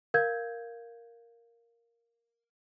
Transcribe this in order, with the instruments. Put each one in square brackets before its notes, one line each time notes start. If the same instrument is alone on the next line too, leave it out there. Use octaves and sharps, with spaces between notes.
[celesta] A#4 F5 G6 G#6